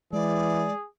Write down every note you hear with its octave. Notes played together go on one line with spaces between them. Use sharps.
E3 G#3 G#4 D5